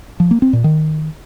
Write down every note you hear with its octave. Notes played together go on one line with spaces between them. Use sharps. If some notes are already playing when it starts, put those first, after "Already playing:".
F3
A#3
C4
A#2
D#3